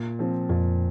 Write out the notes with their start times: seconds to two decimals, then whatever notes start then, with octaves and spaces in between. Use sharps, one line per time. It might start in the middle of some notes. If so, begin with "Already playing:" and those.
Already playing: A#2
0.19 F3 C4
0.49 F2 A#2